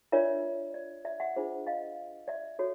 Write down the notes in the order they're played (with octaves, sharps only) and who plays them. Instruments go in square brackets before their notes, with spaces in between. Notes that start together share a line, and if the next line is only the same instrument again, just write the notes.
[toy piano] D4 F4 A#4 C#5 D5 E5
D5
D5 E5
E5 F#5
D4 F4 G#4 C5
D#5 F5
D5 E5
F#4 A4 C#5